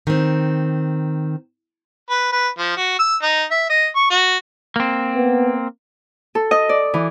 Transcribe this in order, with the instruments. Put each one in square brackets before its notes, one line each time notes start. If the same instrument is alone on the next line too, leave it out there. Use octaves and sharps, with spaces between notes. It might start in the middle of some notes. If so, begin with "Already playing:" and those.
[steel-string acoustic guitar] D#3 C4
[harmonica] B4
B4
F3
F#4
E6
D#4
E5
D#5
C#6
F#4
[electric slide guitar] A#3 C4
[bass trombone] B3
[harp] A4
D#5
D5
E3